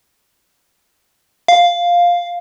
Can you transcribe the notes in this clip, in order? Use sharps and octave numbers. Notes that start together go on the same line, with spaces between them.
F5